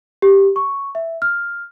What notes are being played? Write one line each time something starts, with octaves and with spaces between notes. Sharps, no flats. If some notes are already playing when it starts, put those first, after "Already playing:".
G4
C#6
E5
F6